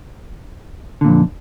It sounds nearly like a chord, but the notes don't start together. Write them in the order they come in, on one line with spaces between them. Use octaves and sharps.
D3 A#2 F2